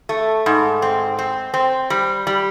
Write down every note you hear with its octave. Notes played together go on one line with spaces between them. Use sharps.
A3
G#2
C4
C4
C4
G3
G3